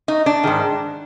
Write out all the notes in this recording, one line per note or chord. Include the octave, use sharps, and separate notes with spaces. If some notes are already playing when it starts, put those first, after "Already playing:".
D#4
D4
G#2 D#3